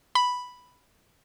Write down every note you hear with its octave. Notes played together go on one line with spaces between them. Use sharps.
B5